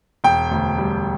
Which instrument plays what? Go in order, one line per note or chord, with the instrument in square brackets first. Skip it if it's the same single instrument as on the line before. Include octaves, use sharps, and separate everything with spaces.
[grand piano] E1 G5
D2
G3